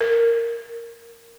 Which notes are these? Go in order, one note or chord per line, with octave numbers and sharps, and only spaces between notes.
A#4